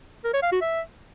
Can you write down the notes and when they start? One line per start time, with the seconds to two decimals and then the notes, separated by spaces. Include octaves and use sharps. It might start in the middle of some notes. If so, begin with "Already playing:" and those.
0.24 A#4
0.33 C#5
0.43 F5
0.52 F#4
0.61 E5